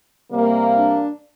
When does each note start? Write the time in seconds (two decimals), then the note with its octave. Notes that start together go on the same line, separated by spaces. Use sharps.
0.31 C3 G3 A#3
0.76 D4